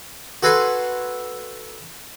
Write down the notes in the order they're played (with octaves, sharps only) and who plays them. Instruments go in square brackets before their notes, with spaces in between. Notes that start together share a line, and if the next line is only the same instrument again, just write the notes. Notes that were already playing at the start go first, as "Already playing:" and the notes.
[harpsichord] F#4 A4 B4 G#5 C6